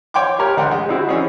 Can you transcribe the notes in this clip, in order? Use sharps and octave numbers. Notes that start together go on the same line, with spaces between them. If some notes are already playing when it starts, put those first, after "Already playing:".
C#5 G5 C6 D6
G4 A#4 C#5
D2 F#5 G5 C6
G#3
C4 D#4 E4 F#4
E3 C#4 G#4